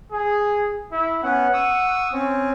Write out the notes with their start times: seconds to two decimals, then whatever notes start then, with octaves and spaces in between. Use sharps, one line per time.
0.12 G#4
0.92 E4
1.23 B3 C#4 F#5
1.53 C#6 D#6 E6
2.13 C4 C#4